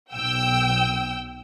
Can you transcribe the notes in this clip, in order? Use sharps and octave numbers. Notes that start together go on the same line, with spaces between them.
B1 G5 E6